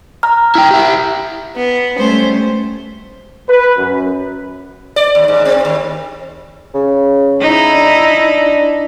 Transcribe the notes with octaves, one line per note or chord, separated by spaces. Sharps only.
A#5 F6
E4 G5
E4 G4
B3
G3 A3 C#4 C5
B4
F#2
D5
D#2
G#2
C4
D#2
C#3
D#4 E4
D4